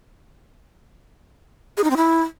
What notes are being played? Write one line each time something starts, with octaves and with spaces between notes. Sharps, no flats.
G#4
D#4
C4
E4